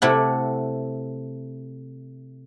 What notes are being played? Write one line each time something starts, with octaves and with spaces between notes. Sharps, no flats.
C3 A3 E4 D5 F#5